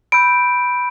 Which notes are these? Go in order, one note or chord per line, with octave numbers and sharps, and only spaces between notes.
B5 E6 G6 D7